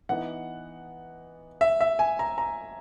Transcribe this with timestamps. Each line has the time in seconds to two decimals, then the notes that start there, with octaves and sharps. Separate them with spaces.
0.09 E3 B3 D#4 F#5
1.61 E5
1.81 E5
1.99 G#5
2.19 A#5
2.38 A#5